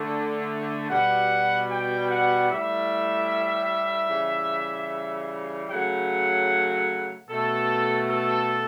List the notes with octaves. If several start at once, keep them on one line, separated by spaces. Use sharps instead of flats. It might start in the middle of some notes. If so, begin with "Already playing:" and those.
Already playing: D3 A3
B2 G3 F#5
G5
F#5
A2 G3 E5
C#3 E3 G3
C#3 F#3 A3 F#5
B2 A3 A4
A4